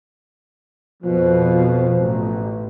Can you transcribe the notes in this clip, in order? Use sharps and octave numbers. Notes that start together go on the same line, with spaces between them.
F2 B2 F3
A1